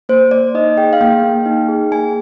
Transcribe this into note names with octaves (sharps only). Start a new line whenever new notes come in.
A#3 C5
A#3 D5
D#4 D#5
G#4 G5
F5
A#3 G5
A#3
D#4
G#4
A#3 G#5